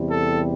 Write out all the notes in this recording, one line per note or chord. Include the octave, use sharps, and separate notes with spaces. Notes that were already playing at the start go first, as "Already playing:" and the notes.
Already playing: E2 C3 G3
A4